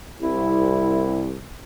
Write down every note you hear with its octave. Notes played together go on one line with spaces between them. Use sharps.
C2 E4